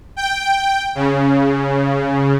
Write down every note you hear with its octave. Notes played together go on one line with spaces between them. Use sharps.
G5
C#3